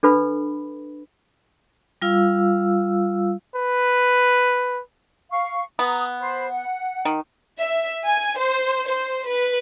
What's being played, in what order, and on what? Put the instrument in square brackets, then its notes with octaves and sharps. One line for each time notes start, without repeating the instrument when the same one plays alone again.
[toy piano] D4 A4 B4 B5
[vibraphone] G3 F4 F5 E6
[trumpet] B4
[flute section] F5 C#6
[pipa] B3 [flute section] A#5 D#6
[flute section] C5 B5
F#5
[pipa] D#3
[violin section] E5
G#5
C5
C5
B4